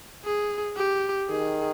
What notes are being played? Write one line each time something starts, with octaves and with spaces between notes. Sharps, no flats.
G#4
G4
D#3 G#4